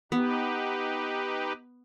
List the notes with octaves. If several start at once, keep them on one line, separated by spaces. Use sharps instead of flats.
B3 D#4 G4 B4